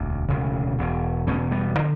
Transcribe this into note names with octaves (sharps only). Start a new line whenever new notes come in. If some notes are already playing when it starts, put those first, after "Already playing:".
Already playing: E1 D2
E1 D2 C#3
E1 E2 B2
E1 E2 B2 A3 C#4
G3 B3
D3